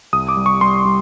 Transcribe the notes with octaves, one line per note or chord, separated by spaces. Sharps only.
C2 D#6
D6
G3
C#6
G3 C6
G3